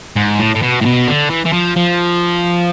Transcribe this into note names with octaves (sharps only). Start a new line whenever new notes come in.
G#2
A2
A2
B2
A2
B2
D3
E3
E3
F3
F3